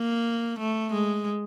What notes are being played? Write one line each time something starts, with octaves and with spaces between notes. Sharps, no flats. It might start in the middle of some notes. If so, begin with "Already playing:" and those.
Already playing: A#3
A3
G#3